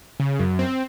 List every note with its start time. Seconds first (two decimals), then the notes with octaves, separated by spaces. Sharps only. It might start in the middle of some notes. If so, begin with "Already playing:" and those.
0.20 C#3
0.40 F#2
0.59 C4